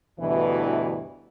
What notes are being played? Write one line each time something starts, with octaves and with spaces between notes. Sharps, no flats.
D2 G2 B2 E3